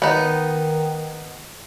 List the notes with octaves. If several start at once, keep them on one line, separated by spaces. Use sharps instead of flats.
D#3 B3 D#4